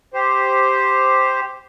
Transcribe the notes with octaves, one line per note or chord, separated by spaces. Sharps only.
G4 C5